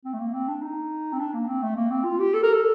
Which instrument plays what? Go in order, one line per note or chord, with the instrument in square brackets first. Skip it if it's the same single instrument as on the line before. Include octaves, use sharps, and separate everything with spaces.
[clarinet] C4
A3
A#3
C4
D4
D#4
C4
D4
A#3
C4
A3
A#3
C4
F4
G4
A4
A#4
A4